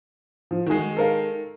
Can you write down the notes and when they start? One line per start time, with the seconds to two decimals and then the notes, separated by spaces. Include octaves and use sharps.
0.51 F3
0.66 D#3 G#3 F#4 G#4
0.97 A4 A#4 F5